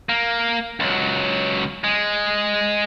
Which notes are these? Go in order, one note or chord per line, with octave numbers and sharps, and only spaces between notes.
A#3
C#2 F#3
G#3